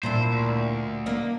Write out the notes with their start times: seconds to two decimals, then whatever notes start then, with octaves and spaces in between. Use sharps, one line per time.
0.03 A#2 D4 E4 C5
0.32 D2
1.06 A#3 D4 D#4